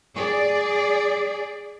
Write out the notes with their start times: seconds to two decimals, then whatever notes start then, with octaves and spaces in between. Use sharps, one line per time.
0.14 G#4 D5